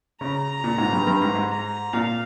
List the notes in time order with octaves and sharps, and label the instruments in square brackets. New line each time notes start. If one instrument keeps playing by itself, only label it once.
[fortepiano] C#3 [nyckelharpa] A#5
[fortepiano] A#2
G#2
G2
G2
G#2
G#2
[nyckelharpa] A#5
[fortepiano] A#2 [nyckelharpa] F5